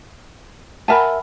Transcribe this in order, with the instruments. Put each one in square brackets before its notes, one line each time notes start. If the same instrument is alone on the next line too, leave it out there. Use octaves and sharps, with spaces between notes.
[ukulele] A#4 E5 A5 [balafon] F#5 G#5 B5